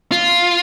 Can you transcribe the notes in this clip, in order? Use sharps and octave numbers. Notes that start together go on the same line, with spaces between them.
F4